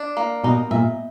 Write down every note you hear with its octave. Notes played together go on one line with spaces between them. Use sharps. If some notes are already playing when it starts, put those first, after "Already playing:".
Already playing: D4
A#3
B2 D#4
A#2 E5